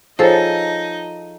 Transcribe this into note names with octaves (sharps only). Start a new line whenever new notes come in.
F3 D#4 G#4 A4 C5 C#5 D#5